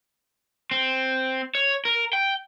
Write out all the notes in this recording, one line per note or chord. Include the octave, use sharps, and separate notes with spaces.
C4
C#5
A#4
G5